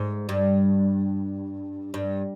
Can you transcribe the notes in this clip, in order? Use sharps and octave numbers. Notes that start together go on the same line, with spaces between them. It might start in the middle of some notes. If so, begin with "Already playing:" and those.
Already playing: G#2
G2
G2